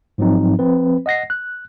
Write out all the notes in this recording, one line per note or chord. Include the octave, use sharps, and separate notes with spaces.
G#2 F3 F#3 C4 D#4
F3 C4 B4
D#5 F#5 A#6 C7
F#6